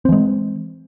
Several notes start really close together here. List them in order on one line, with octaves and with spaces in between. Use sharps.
C4 E3 G#3